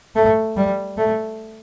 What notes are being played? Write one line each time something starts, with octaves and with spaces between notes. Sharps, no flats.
A3
G3
A3